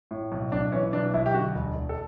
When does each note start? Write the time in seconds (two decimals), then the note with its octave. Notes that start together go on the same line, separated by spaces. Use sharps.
0.11 A2
0.32 B1
0.52 B1 D4
0.72 E3 C#4
0.93 B1 D4
1.14 B1 E4
1.26 G4
1.34 D3 F#4
1.55 E1
1.75 E1
1.89 A4